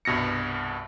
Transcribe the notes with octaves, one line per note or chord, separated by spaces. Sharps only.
C2 G2 B2 A#6 C#7